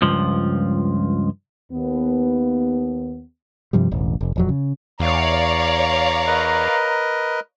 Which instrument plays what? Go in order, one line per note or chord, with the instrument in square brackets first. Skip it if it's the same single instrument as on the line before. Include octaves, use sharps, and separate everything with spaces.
[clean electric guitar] C#2 G2 F3
[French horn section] D#2 B3
[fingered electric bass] G2 C3 F3 G3
E1 A1
F1
D#1 F2 F#3
C#3
[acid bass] E2 [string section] C#5 D5 F5 [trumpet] A#5
[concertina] A#4 B4 D#5